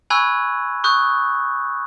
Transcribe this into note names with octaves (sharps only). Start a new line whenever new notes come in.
G#5 B5 C#6 E6 F#6 G#6
C#6 D#6 F#6 G6